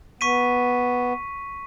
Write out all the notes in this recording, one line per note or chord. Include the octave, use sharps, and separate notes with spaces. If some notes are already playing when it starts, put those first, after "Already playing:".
B3 C#6 B6 D#7